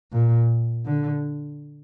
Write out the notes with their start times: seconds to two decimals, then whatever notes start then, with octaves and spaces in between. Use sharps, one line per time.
0.12 A#2
0.85 D3